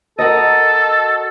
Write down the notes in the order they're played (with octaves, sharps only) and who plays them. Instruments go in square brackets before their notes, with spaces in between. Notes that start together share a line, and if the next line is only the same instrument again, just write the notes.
[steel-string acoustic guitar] F#4 A#4 D#5 [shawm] A4